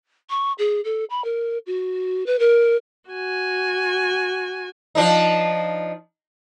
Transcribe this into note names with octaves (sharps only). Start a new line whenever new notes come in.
C#6
G#4
A4
B5
A#4
F#4
B4
A#4
F#4 G#5
F3 D4 D#4